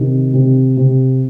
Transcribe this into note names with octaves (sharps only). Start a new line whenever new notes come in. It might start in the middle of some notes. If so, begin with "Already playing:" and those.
Already playing: C3 D#3
C3
C3